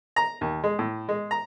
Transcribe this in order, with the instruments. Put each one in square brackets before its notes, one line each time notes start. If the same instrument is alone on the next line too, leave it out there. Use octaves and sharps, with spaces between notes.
[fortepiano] A#5
D#2
G#3
A2
G#3
A#5